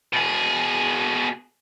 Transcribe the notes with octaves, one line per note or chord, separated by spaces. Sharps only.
B2 G#4